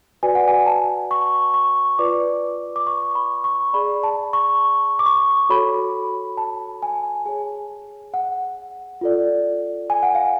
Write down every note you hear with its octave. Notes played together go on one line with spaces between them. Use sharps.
F#4 B4 D5 G#5
F#5
G#5
A5
C#6
C#6
F4 B4 D5 D6
D6
C#6
B5
C#6
G#4 D5 B5
A5
C#6
D6
C#6
F#4 A4 C#5 B5
A5
G#5
G#4 C#5 G#5
F#5
F4 A4 D5
G#5
F#5
F5